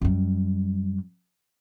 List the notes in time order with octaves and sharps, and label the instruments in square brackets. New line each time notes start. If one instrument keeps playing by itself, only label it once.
[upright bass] F#2 G3